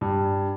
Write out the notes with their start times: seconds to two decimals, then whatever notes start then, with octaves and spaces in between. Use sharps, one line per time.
0.01 G2